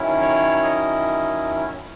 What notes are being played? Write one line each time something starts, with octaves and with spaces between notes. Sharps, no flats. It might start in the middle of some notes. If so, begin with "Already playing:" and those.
Already playing: D#3 F#3 C#4 E4
C#5
D#5